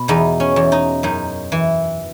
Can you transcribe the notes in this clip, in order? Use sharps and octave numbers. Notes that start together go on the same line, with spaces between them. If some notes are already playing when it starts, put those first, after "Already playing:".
Already playing: B2
E2 D#4
C#4
E2
D#4
F#2 D#4
E3